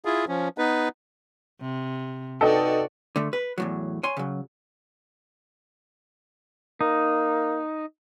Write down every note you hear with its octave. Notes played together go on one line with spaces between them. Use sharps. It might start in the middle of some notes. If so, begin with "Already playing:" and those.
E4 F4 G#4
F3 C#4
B3 D#4 B4
C3
D#4 F#4 A4 B4 D5 D#5 G5
D3 A3
B4
E2 A2 F#3
C#5 G#5 C6
C#3 F#3
A#3 D#4